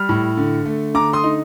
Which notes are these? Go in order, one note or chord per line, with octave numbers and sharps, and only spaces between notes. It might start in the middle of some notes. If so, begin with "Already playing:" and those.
Already playing: G3 F6
A2
D3
A3
D3 A#5 D6
C6 D#6
D#4